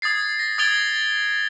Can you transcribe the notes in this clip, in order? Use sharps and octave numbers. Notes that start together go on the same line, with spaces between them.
D#6 G#6 A6 C7
A#6
D#6 G#6 A6 D7 F7 G7